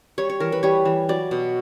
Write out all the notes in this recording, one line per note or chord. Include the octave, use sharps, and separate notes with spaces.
G3 C#5
C#5
E3 A#4
B4
G3 C#5
E3
F#3 D5
B2